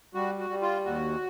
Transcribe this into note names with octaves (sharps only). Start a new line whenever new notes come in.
G3 F#4
F#4
G3
F4
D#2 F#4